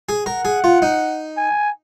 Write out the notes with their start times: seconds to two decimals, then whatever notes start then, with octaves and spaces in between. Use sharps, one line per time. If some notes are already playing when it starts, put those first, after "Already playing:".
0.09 G#4
0.26 A#4 F#5
0.45 G#4
0.64 F4
0.82 D#4
1.37 G#5